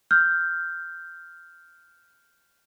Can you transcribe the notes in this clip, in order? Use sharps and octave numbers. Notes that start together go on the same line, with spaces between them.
F6 G6